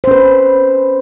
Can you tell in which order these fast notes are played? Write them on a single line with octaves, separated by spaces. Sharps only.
C5 C#4 B4